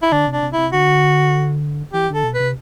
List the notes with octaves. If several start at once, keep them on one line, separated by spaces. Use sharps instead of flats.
E4
D3 D4
C3
D4
C3
C3 E4
D3 F#4
E3 G4
D3 A4
B2
B4
C3